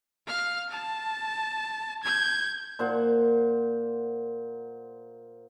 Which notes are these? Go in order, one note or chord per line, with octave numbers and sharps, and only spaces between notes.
F5 F6
A5
G6 G#6
A#2 C5 F#5